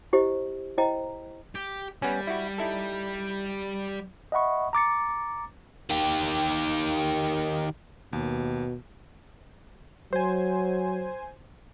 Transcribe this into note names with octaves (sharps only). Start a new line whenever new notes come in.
E4 G4 C5 D#5
E4 C5 D#5 G5 A#5
G4
G3 B3 C#4
E4 F#4
D#4 E4 A4
D#5 E5 F#5 B5 C#6
A#5 D6 A6 C#7
D#3 G4
D#2 B2
F#3 C5 G#5